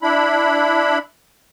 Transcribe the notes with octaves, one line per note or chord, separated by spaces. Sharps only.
D4 E4 B5